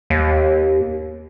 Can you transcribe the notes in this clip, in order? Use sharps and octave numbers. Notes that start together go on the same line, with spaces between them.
D#2